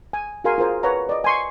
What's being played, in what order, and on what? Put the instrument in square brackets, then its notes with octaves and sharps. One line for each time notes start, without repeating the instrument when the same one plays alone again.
[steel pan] G#5
F#4 G#4 A#4 F5 G#5 C6
F4 G#4 A#4 C5 G#5
B4 C#5 F#5 A#5
D5 D#5
G#5 C6 C#6